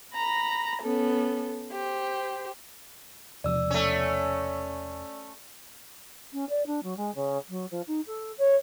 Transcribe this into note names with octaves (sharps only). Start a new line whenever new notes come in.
A#5 B5 A#6
B3 C#4 A4
G4 C5
E1 C3 F3 D5 E6
A3 C#4
C#4
D5
D4
F#3
G#3
C#3
F#3
F3
D#4
A4
C#5